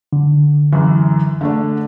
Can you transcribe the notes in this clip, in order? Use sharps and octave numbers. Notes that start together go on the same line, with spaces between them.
D3
F#2 E3
D3 A3 D4